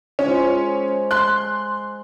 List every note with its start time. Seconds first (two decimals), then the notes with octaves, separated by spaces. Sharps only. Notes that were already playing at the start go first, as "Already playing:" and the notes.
0.19 F3 G#3 C#4
1.11 C6 F#6